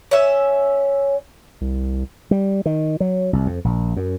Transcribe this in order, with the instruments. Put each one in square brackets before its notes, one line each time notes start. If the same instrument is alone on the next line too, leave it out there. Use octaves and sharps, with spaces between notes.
[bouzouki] C#4 E5
[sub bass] C2
[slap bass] G3
D#3
F#3
C2
F2
A#1
F#2